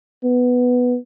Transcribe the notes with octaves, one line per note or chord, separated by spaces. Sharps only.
B3